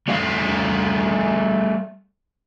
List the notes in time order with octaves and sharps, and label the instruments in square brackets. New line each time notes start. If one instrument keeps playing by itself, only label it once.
[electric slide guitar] G3 A3 C#5 D5 F5